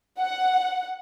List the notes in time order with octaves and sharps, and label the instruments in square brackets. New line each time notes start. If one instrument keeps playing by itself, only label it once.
[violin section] F#5